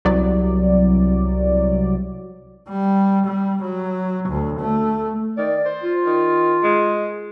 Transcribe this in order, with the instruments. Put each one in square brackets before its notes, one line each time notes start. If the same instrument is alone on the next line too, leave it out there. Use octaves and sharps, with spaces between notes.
[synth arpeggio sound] C2 F#3 D5
[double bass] G3
G3
F#3
D2
A3
[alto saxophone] D#3 [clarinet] D5
[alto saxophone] C5
[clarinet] F4
[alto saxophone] D#3
G#3